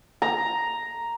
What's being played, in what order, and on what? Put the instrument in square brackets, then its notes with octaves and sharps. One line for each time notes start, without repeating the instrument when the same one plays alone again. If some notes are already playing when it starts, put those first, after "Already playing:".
[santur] A#5